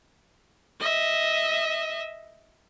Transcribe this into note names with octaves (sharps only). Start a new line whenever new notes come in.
D#5 E5